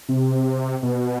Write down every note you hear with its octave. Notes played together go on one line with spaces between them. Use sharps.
C3
B2